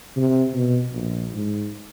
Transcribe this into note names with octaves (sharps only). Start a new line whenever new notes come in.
C3
B2
A#1
G#2